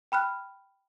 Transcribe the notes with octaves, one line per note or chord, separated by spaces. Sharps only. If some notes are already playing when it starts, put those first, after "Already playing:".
G5 B5 F6 F#6